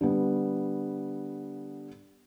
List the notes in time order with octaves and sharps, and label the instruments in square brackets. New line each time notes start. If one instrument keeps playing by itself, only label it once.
[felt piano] D3 G3 B3